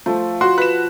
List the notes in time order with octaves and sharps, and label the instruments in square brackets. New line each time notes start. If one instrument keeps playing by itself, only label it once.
[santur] F3 C5 [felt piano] A3
[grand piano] F#4 [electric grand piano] C6
[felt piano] B4 E7 [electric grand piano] F#6